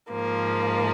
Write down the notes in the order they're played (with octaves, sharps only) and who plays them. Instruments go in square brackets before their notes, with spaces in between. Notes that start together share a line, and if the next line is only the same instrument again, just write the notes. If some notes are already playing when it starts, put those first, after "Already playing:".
[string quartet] G#2 F3 A#3